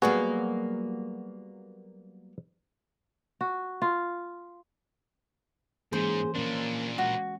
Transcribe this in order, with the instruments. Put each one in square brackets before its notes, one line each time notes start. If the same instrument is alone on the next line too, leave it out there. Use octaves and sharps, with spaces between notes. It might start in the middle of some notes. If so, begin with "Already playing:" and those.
[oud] F#3 G3 A#3 [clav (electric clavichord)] B3 F#4 G#4
[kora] F#4
F4
[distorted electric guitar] G#2 [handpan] E3 A#3 C#4 [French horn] G#4 [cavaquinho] C5
[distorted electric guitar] A#2 D4 [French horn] A#3 [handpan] C#4
[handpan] G#3 [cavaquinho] F#4